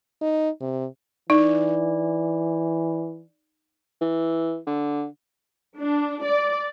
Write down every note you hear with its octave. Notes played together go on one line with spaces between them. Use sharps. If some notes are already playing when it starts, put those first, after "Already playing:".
D#4
C3
E3 D#4 D5
E3
D3
D4
D5